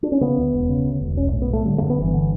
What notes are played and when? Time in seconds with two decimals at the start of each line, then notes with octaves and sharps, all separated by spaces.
0.03 D4
0.12 C#4
0.21 C#3 B3
0.37 D2
0.53 E1
0.69 C#3
0.85 D2
1.01 E1
1.17 B1 C#4
1.33 A2
1.42 B3
1.50 A2 A3
1.65 D3 G3
1.78 A3
1.82 G2
1.90 B3
1.98 G1 E3
2.14 D3